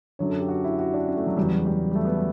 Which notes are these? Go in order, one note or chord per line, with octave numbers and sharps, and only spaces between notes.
F#2 D3 F#3 C#5
A4
G4
F#4
E4
F#4
D4
C#4
A3
F#3
E2 C#3 F#3 G3
F#3
G3
G3
A3
B3
A3